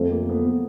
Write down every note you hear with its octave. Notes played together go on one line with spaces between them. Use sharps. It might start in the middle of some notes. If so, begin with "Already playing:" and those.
Already playing: F2 A3
A#3
B3